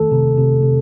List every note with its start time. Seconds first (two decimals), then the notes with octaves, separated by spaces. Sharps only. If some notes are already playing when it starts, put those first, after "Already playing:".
Already playing: D#3 A3 A4
0.12 C3
0.38 C3
0.63 C3